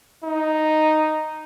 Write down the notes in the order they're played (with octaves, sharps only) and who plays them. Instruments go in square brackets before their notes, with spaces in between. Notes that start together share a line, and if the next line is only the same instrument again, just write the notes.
[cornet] D#4